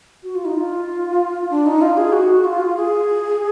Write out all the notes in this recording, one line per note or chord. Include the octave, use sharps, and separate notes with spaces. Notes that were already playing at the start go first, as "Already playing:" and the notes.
F#4
F4
D#4
F4
D4
D#4
F4
G#4
F#4
F4
G#4